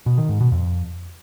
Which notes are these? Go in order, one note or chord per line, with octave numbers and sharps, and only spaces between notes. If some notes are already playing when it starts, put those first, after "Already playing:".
B2
D#3
G#2
B2
F2